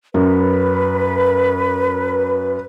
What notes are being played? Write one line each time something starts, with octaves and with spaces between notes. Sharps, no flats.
F#2 B4